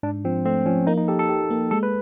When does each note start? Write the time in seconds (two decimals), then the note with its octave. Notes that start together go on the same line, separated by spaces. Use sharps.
0.03 G#2 D4
0.25 F3 C4
0.45 A3 C4
0.66 F3 C#4
0.87 A#3 D#4
0.97 D#4
1.08 G4 A4
1.19 A4
1.29 G4
1.50 A#3
1.71 G#3 A4
1.83 B4